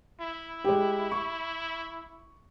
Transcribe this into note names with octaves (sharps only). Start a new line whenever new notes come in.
E4
G#3 G4
C#6